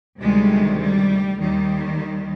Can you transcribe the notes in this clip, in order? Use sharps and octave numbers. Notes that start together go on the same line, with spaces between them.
D2 C3 D#3 G3 G#3
G3
D#2 D#3 G3